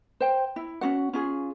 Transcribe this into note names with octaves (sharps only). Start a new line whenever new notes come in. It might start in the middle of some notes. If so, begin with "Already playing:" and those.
C5 G5
E4
C#4 D4 F#4 F#5
C#4 F4 G#4